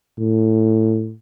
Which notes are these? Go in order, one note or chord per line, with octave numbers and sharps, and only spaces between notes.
A2